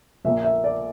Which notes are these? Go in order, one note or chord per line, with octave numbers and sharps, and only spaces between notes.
A#1 A#2 A#3 E5
E5
D5